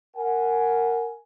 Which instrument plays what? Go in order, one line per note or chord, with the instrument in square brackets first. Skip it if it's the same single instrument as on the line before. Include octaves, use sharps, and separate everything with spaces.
[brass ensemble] A#4 F#5 G#5